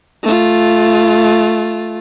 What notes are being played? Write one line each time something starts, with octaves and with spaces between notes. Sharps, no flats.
A3 F4